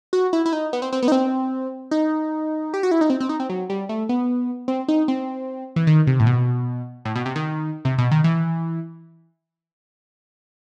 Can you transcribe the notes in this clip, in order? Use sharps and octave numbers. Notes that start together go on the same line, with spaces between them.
F#4
E4
E4
D#4
B3
C4
C4
B3
D#4
C4
D#4
G4
F#4
E4
D#4
C4
C4
D#4
C4
F#3
G3
A3
B3
C4
D#4
C4
E3
D#3
C3
A2
B2
A2
B2
C3
D#3
C3
B2
D#3
E3